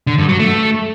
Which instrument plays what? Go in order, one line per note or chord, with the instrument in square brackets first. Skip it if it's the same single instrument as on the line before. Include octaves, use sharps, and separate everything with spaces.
[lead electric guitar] D3
G2
F#3
A3